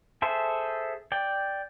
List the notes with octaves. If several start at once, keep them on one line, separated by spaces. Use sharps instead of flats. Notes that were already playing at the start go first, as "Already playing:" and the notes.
G#4 A4 C5 E5
D5 G5